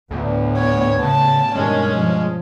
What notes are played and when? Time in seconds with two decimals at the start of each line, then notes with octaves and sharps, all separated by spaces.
0.11 D2 A2 B3
0.57 C#5
1.03 C#3 A5
1.55 G2 B2 D#3 G#3 C#4
1.97 F3